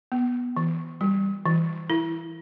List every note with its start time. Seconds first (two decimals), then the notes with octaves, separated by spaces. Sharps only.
0.12 B3
0.57 E3
1.01 G3
1.46 E3
1.90 E4